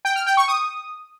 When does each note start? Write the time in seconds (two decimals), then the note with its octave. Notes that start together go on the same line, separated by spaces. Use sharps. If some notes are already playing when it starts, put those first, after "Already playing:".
0.05 G5
0.16 F6
0.26 G5
0.37 C#6
0.48 D#6